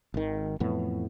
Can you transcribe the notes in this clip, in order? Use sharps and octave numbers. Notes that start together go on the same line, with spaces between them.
G#1 D#3
F2 A2 E3 B3